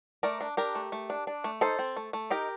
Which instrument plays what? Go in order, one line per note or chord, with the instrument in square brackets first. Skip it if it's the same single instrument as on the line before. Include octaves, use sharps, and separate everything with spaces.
[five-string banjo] A3 A#4 D5
D4
D4 G4 A#4
A3
A3
D4
D4
A3
D#4 A4 C5
C4
A3
A3
D#4 G4 A#4